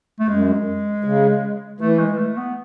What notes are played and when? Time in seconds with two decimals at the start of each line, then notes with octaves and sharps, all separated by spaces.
0.20 A3
0.28 F#2 G#3
1.04 C#3
1.80 E3 A3
1.99 G#3
2.18 A3
2.37 B3